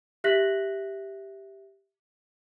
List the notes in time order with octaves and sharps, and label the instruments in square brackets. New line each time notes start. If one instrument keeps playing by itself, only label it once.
[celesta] G4 E5 F#6 A#6 B6 F#7